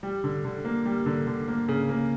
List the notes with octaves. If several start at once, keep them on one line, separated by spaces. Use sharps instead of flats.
G3
D3
D3
A#3
G3
D3
D3
A#3
C#3
A#3